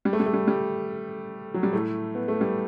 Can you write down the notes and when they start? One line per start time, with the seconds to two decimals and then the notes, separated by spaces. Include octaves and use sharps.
0.05 G3
0.13 A3
0.20 G3
0.26 A3
0.33 G3
0.48 G3
1.54 F#3
1.63 G3
1.73 A2 A3
2.15 B3
2.28 A3
2.41 G3